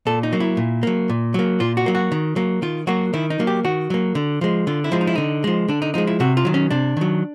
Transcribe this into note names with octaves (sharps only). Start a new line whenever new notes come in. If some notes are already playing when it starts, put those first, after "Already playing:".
A#2 A4
D#4
F#3 A#3
E4
A#2
F#3 A#3
A#2
F#3 A#3
A#2 F4
F#4
F#3 A#3
F#4
D#3
F#3 A#3
D#3 F4
F#3 A#3 F#4
D#3 E4
D#4
F#3 A#3
G4
D#3 F#4
F#3 A#3
D3
F3 G#3
D3 F4
E4
F3 G#3
D#4
E4
D3 D#4
F3 G#3
D3 D4
D#4
F3 G#3 D#4
E4
C3 F#4
F4
D#3 F#3
C#4
C3 D4
D#3 F#3